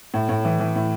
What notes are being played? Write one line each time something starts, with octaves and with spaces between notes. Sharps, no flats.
A2
A2
E3
E3
A2